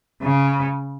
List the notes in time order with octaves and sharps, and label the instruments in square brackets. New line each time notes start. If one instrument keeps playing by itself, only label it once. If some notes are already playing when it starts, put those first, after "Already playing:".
[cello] C#3